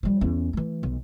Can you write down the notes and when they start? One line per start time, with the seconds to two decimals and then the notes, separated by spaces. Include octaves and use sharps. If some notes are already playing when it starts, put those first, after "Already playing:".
0.03 F3 G3
0.21 E2 C#4
0.53 E3 A3
0.83 B1